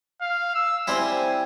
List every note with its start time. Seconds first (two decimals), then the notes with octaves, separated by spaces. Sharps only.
0.21 F5
0.55 E6
0.87 G3 C4 E4 G#5